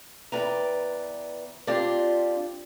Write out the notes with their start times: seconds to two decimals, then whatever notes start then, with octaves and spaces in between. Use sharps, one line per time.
0.32 E2 B4 D5 G5 A#5
1.67 C4 D4 F4 G4 D5